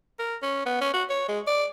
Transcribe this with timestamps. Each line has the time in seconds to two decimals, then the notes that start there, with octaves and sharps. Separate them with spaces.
0.19 A#4
0.42 C#4
0.66 B3
0.81 C#4
0.93 F#4
1.10 C#5
1.28 G#3
1.47 D5